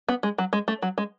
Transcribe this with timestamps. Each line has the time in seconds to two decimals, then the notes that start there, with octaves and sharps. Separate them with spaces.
0.08 B3
0.23 G#3
0.38 F#3
0.53 G#3
0.68 A3
0.82 F#3
0.98 G#3